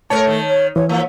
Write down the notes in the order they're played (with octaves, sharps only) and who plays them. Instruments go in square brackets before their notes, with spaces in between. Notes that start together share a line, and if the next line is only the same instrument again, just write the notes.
[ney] A3 [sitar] A#4 B4 C#5 [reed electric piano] A5
[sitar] D#3
[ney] C#5
[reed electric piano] E3 [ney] C#5
[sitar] F3 [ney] A#3